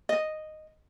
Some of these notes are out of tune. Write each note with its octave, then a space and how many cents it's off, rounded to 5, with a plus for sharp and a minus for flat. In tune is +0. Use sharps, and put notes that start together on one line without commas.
D#5 -5